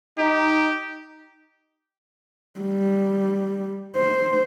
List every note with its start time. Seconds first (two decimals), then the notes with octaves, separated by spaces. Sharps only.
0.18 D#4 G4
2.60 G3
3.96 C5